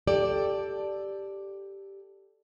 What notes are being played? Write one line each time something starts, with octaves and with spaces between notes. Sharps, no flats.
G4 A4 D5